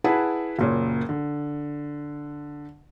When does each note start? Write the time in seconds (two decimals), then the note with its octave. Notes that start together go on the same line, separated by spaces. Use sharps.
0.04 E4 G#4 B4 F#5 A5
0.59 F#1 A#2 C#4
1.09 D3